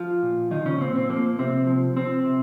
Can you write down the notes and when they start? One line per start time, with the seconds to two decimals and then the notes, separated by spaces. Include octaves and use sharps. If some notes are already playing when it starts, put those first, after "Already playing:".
Already playing: F3 F4
0.23 A#2
0.51 D#3 F3 D#4
0.66 C#3 C#4
0.80 A#2 C4
0.96 C4
1.09 F3 A#3
1.39 C3 C4
1.67 F3
1.96 F3 C4
2.25 C3